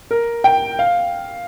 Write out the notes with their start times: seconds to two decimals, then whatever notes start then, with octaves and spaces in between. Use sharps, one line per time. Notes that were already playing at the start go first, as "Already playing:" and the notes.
0.11 A#4
0.44 G5
0.79 F5